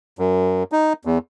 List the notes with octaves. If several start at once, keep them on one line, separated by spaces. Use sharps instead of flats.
F#2
D#4
E2